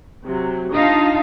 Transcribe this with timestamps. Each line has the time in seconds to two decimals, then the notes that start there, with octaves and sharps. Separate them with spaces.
0.25 C3 F#3
0.72 D4 D#4 F4 F5 A5 D#6